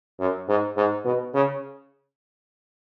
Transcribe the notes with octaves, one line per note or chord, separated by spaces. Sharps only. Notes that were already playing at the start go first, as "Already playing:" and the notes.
F#2
G#2
G#2
B2
C#3